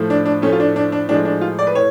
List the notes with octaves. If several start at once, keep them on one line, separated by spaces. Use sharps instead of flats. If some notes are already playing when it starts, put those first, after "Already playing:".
Already playing: A2 F3 A3
D4
D4
A2 F3 A3 C#4
F4
D4
D4
D4
A2 F3 G#3 D4
D4
F4
D5
B4
A2 C#5